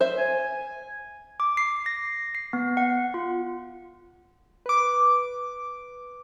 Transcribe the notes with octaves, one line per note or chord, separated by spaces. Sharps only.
C5 E5
G#5
D6
C7
A#6
C7
B3
F#5
F4
B4 D6